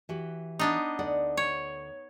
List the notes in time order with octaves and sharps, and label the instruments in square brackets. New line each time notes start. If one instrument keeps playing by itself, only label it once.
[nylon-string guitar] E3 F#4 G4
[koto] B3 D4 D#4
[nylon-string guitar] D2 D5 F#5
[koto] C#5